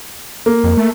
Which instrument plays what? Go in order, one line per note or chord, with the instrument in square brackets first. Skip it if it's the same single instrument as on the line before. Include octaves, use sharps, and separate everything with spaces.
[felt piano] A#3
[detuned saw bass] F2
A3